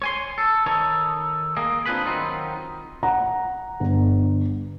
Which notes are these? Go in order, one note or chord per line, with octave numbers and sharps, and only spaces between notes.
C#5 G#5 C6
A4
D#3 D#4 A4 C#5
A#3 G#4 D#5
C4 D4 F4 G#4 B4 B5
D#3 F#3 C4 D#4 F4
F#5 A#5
G1